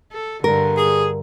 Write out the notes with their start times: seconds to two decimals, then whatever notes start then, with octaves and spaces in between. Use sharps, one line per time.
0.12 A4
0.44 G2 D3 A#4
0.77 G#4